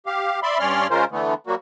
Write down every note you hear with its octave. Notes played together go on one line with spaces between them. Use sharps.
G4 F5
D5 E5 B5 C6
G2 C#4 C#5 D5 C6 F6
C#3 G#3 C#4 F4 A#4 C5
D3 E3 A3 B3
F#3 G3 A#3 F#4